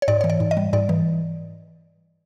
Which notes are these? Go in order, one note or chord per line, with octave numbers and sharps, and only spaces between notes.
C#5
G#2 D5
E3 C#5
D5
G#2
D#5
G3
G#2 D5
E3